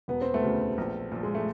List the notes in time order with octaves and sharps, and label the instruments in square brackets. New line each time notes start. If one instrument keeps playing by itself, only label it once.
[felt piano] E1 [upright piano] B3
[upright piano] C4
A3 B3
[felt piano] D2 C#3
A#1
A#2 F3
[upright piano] G#3
A3